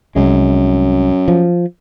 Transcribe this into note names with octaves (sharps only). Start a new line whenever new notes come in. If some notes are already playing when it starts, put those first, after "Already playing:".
C2 F#2 G#3
F3